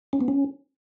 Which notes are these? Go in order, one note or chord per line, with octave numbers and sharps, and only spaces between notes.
C#4
B3
C#4